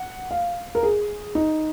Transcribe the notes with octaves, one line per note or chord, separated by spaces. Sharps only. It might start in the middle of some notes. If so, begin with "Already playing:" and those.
Already playing: F#5
F5
A#4
G#4
D#4